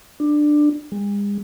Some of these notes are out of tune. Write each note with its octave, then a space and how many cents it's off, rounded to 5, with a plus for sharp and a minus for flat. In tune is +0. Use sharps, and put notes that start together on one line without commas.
D4 +15
G#3 -40